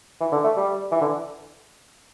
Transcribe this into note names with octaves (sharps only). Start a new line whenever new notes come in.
E3
D3
A3
G3
E3
D3